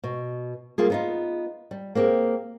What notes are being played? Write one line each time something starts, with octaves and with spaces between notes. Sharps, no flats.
B2
G3 A#3 F4 G#4
B3 D#4 F4
G3
A#3 C4 G4 G#4